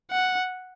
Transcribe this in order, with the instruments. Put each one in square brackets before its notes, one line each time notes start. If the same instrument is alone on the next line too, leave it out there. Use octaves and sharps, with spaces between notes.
[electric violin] F#5